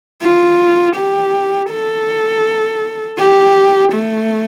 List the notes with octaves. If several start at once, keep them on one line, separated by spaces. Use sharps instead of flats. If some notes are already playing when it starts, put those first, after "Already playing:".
F4
G4
A4
G4
A3